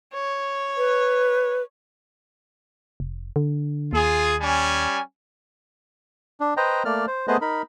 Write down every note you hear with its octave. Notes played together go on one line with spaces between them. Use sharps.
C#5
B4
F1
D3
D#2 F4 G#4
G3 C#4 G#5
D4
B4 C5 D#5 G5 A#5
A3 A#3 D5 F6
C5
A3 B3 G#4 B4 C5 D#5
D#4 A#4 B5